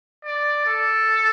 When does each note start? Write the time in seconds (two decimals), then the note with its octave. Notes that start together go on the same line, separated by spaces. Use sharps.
0.25 D5
0.66 A4